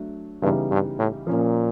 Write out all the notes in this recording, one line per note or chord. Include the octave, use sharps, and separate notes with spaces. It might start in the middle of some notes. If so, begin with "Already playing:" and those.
Already playing: F#3 A3 D4
G2 C#3 E3 G3 B3 D#4
G2
A2
A#2 F3 A#3 C#4